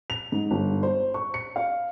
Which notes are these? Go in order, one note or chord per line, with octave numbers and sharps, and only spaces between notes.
F7
G#2
G1
C5
C#6
C#7
F5